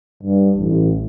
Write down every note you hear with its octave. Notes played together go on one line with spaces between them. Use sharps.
G2
A1